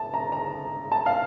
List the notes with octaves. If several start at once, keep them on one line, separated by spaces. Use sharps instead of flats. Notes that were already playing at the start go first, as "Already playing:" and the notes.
Already playing: A5
A#5
A#5
A5
F5